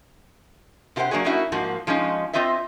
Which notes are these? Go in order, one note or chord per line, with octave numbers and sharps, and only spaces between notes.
C3 F4 G4 A#4 C5 F#5
F#3 A#3 D4 F#4 G#4
A#3 C#4 D#4 E4 F#4
G#2 F3 A#3 F#4
F3 G#3 C#4 D#4
C4 F4 C5 D#5 E5